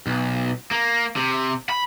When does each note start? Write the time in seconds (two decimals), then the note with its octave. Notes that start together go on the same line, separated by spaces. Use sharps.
0.07 B1
0.71 A#3
1.16 C3
1.69 B5